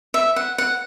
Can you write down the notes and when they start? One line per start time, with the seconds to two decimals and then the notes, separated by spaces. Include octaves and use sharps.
0.14 E5
0.36 F#5
0.58 F#5